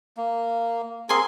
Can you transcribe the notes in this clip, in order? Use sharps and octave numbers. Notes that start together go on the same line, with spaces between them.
A#3
C4 G#4 A#4 G#5 C6